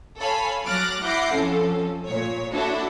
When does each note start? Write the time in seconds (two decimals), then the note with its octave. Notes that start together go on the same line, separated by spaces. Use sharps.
0.18 A4 C#5 F5 G#5 B5
0.65 F#3 D6 F6 F#6 A6 A#6
1.02 E4 F#5 D6 G6 A#6 C7
1.33 F2 F3 C#4 A4
2.08 A#2 C#5
2.54 D4 E4 F#4 A4